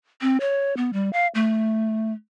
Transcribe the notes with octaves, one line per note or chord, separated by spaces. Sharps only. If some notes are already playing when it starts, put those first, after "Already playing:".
C4
C#5
B3
G3
F5
A3